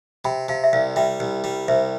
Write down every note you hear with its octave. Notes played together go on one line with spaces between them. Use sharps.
C3 G5 B5
C3 F5 A5
E5
C2 D5 F5
G3 E5 G5
C2
G3
C2 C5 E5